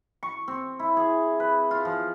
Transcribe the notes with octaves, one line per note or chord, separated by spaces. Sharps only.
C#6
C4
E4
G#4
B4
F4
F3